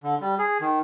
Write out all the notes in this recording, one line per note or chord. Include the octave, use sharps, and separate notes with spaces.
D3
G3
G#4
D#3